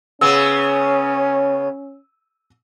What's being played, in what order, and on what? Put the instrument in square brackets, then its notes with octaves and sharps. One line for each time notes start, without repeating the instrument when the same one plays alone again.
[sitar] C#3 B3 [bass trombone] C#4 [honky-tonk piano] E6 D#7